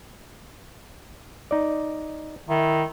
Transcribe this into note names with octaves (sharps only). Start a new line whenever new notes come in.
D#4 D5
D#3 E4